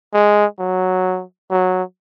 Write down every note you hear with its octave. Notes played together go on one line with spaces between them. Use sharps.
G#3
F#3
F#3